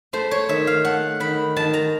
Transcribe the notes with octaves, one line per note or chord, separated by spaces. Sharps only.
A3 C5
C#5
D#3 E5
F5
A3 F#5
D#3 B5
D#3 A5
A#5